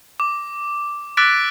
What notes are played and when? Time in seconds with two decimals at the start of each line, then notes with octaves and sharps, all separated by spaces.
0.20 D6
1.17 D6 E6 F#6 A6 B6 D7